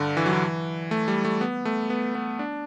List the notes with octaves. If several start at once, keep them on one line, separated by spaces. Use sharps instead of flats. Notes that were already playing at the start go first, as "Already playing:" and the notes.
Already playing: G2 D3
E3
F#3
E3
A3
G3
A3
B3
A3
B3
B3
D4